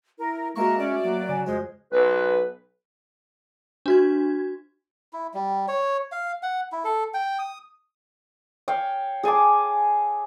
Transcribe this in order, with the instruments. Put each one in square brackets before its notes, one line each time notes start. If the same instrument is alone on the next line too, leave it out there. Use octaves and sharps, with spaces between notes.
[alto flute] E4 [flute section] A#4
[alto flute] G#3 [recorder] A#3 [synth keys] F#4 E5 C#6 [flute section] A#4
[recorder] C#4 [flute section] D5
[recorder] F#3 [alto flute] A#3
[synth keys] C#3 [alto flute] G#5
[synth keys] F2 F#4 [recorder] G#3 [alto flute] C5
[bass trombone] B1 [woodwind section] B4
[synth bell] D4 F#4 G#6
[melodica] E4
G3
C#5
F5
F#5
E4
A4
G5
D#6
[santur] C#5 F5 G5
G#4 G#5 A5 D6